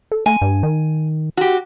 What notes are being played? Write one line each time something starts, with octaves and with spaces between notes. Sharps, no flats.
A4
A3 G#5
G2
D#3
F#4 G4